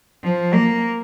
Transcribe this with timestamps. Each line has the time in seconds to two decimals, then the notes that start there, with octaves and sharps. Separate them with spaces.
0.24 F3
0.54 A#3